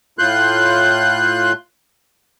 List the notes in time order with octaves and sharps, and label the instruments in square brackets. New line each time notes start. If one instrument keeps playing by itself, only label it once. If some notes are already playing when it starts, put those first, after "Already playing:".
[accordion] A2 F4 C6 F#6 G6